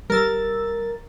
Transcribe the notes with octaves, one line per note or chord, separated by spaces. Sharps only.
G3 A#4 E6 A6